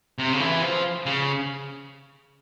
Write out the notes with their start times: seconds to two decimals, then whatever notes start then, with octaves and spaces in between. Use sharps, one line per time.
0.18 C3
0.33 C#3
0.40 E3
0.62 F3
1.06 C#3